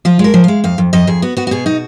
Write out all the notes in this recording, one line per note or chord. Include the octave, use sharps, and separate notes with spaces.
F3 F4
G#3
A#4
F3
G#3 F5
F2 F5
F2
F2 D#5
F2 G#4
B3 F#4
B3 F#4
F#4
B2 G#4
D#4 F#4